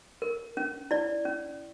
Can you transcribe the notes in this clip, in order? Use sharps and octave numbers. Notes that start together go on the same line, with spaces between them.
A#4
C#4
E4 D5
C#4